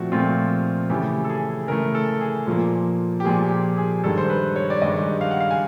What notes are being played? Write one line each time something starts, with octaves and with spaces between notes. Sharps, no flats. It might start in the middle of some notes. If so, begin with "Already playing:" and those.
Already playing: A#2 F3 A3 C4 F#4
A#2 F3 A3 C4 F4
C#3 E3 A3 G4
A4
G#4
C#3 E3 A3 A#4
A4
G#4
A#2 F3 A#3
G4
A#2 F3 A#3 G#4
G4
G#4
G2 D#3 G#3 A4
C5
B4
C#5
D5
G2 D#3 G#3 D#5
F5
F#5
F5
G#5